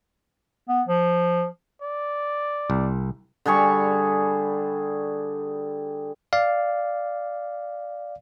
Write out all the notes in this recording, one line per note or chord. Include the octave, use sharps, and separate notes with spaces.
B3
F3
D5
C2
D3 G3 G#4 C#6
D5 F5